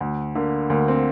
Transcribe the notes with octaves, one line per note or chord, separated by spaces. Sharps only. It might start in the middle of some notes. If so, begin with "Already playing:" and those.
D2
D3 A#3
D2 A#3
C4